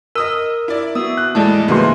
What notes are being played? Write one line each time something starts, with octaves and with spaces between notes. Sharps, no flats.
A#4 D#5 D#6 E6
E4 D5
B3 F#4 E5 D#6 E6
F#6
E2 A2 G#3 A3 E4 D5 D#5 A5
C#2 G#2 C#3 E3 A#3 F#4 C6